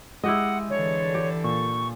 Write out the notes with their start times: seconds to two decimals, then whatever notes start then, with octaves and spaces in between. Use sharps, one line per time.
0.24 G#3 E4 G4 D#5 F#5
0.70 D3 E3 A4 C#5
1.14 G4
1.44 A#2 C#6